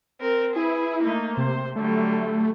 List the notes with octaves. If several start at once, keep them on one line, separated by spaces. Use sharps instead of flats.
C4 A#4
E4 G#4 B4
A3 A#3 D#4
C3 C5
D3 F#3 G3 A3